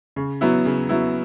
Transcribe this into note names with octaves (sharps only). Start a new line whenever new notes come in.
C#3
F#3 B3 E4
C#3
F#3 B3 E4